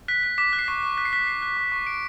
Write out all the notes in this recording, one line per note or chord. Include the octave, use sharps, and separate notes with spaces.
F#6 B6
F#6
D6 B6
F#6
C7
C#6 B6
C#6
F#6 B6
C7
F#6 B6
F#6 C7
F#6
C#6
C#6
F#6 D7